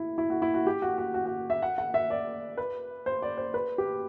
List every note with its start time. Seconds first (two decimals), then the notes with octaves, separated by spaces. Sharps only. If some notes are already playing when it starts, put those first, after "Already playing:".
Already playing: E4
0.18 E4
0.30 F#4
0.42 E4
0.54 F#4
0.67 G4
0.82 F#4
0.98 F#4
1.14 F#4
1.26 F#4
1.50 E5
1.62 F#5
1.78 F#5
1.94 E5
2.10 D5
2.57 B4
3.06 C5
3.22 D5
3.38 C5
3.54 B4
3.78 G4